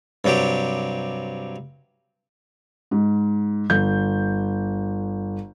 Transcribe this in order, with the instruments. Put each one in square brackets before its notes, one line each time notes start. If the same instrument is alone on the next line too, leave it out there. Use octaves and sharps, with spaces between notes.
[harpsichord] G2 C3 F#3 G4
[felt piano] G#2
G1 G6